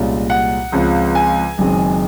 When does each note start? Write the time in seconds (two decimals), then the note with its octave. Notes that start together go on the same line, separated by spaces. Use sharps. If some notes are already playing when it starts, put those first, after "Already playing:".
Already playing: C2 A#2 G#3 C#4 F4
0.30 F#5
0.72 C#2 C#3 F3 C4 F4
1.15 G#5
1.58 F#1 F#2 D#3 G#3 C4